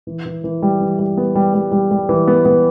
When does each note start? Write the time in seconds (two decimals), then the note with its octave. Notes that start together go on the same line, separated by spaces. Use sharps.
0.07 E3
0.26 E3
0.44 E3
0.62 G3
0.81 E3
0.99 G3
1.17 B3
1.35 G3
1.54 G3
1.72 G3
1.91 G3
2.09 E3
2.27 B3
2.45 B3